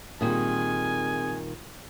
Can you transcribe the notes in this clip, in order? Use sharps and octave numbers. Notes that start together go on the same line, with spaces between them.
A#2 D#3 G3 C4 G#4 G#5 D#6